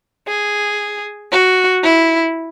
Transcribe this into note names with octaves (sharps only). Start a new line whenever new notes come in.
G#4
F#4
E4